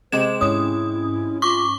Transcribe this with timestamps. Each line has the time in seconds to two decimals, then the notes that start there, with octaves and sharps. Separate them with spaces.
0.12 C3 G#3 G4 C5 G#6 E7
0.41 G#2 C#4 E4 D#6
1.42 F4 C#6 D6